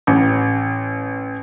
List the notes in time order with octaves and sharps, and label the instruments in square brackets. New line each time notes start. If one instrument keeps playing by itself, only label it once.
[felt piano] A1